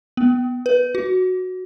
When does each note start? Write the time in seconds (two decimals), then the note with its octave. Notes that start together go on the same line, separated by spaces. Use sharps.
0.17 B3
0.66 B4
0.95 F#4